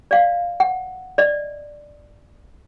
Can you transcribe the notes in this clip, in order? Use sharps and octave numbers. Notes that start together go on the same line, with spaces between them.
D5 F5
F#5
D5 D#5